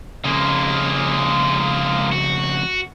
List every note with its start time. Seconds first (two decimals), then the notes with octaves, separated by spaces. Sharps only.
0.24 F2 C#3 G#3 A#3
2.12 F#4